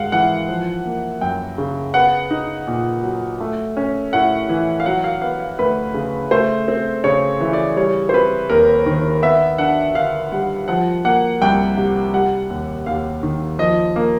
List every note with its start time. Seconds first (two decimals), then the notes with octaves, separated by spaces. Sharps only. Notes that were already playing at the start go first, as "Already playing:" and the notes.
Already playing: G#2 F5 F#5
0.12 E3 F#5
0.48 F3
0.86 A#3
1.21 F#2 G5
1.58 C#3
1.94 B3 F#5
2.31 D#4
2.67 A#2
3.03 F#3
3.40 A3
3.77 C#4
4.13 A2 F#5
4.49 E3
4.80 F5
4.86 F#3 F#5
5.04 F5
5.22 B3 F5
5.40 F5
5.59 D2 B4
5.94 C#3
6.31 A3 C5
6.68 C4
7.04 C#3 C#5
7.41 E3
7.53 D5
7.76 G3 C#5
8.09 C5
8.13 C4 B4
8.50 D#2 A#4
8.86 D#3
9.22 B3 E5
9.58 D4 F#5
9.95 D3 F5
10.32 G3 F#5
10.68 F3 F#5
11.05 A#3 F#5
11.42 C2 G5
11.77 C3
12.14 G3 F#5
12.50 D#2
12.86 D#2 F5
13.23 D#3
13.59 F3 D#5
13.96 A#3